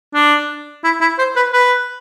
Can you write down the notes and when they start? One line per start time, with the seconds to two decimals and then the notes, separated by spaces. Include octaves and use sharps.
0.14 D4
0.84 E4
1.01 E4
1.18 C5
1.36 B4
1.53 B4